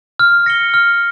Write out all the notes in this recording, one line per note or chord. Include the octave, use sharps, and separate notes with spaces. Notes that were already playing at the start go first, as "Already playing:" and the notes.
F6
A#6 C#7 G7
F6